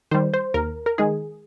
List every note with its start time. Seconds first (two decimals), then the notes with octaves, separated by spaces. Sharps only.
0.11 D#3 G3 C5
0.34 C5
0.54 D#2 A#4
0.86 A#4
0.98 D#3 G#3 G#4